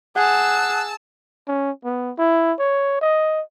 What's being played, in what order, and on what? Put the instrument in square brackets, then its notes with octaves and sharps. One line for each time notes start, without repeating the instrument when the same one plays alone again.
[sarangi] G#4 [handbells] F#5 [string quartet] A5 E6 [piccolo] F#6
[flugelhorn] C#4
B3
E4
C#5
D#5